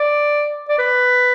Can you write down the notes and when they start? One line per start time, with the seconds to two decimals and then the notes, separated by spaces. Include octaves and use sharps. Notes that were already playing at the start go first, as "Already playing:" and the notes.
Already playing: D5
0.69 D5
0.78 B4